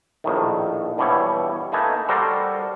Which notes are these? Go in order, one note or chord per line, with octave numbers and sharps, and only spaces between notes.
A#1 A2 D#3
G2 B2 E3 G3 C#5
A3 A#3 D#4 B4 G#5 A5
G3 F#4 A4 A#4 C5 D5